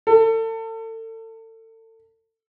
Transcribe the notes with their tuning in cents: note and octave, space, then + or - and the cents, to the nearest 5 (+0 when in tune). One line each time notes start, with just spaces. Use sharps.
A4 +35